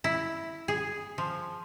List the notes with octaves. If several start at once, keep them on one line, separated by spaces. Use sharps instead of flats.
E4
G#4
F3